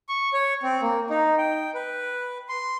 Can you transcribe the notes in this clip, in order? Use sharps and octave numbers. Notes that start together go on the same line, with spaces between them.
C#6
C#5
C4
A#3
D#4
G5
B4
C6